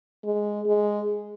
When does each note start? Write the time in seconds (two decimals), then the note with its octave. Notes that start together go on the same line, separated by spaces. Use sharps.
0.25 G#3
0.66 G#3